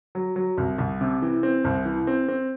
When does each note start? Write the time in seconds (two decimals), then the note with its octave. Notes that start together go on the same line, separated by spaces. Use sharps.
0.15 F#3
0.36 F#3
0.58 C2
0.78 C2
1.01 C3
1.22 E3
1.43 C4
1.64 C2
1.85 E3
2.07 C4
2.28 C4